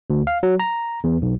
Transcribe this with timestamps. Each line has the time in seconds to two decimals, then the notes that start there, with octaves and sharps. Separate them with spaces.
0.10 D2
0.27 F5
0.43 F#3
0.60 A#5
1.04 E2
1.22 B1